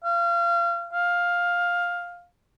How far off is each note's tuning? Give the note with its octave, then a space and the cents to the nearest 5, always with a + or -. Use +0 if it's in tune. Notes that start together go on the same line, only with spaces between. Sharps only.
F5 -30
F5 +10